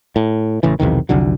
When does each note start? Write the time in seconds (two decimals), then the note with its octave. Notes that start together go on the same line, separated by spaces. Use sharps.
0.16 A2
0.63 A1 C#3 E3
0.80 B1 E2 C3 D#3
1.09 F1 C2 D3 F#3